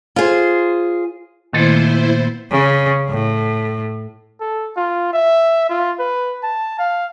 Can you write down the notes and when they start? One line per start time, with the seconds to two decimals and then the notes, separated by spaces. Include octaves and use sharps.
0.16 F4 G#4 C5
1.53 A#2 D#3 A3 B3 E4 A4 C5
2.51 C#3
3.09 A2
4.41 A4
4.77 F4
5.13 E5
5.70 F4
5.99 B4
6.43 A5
6.79 F5